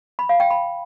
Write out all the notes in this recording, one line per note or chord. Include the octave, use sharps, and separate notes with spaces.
B5
F5
G5
B5